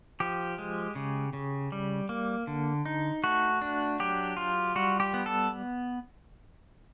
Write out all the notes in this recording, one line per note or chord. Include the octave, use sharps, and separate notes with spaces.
F3 G4
G#3
C#3
C#3
G3
A#3
D3
D#4
A3 F#4
D4
F#3 G4
F4
G3 F#4
G4
B3
A4